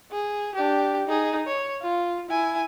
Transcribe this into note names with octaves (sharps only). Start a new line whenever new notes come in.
G#4
D4 G4
D#4 G#4
C#5
F4
E4 G#5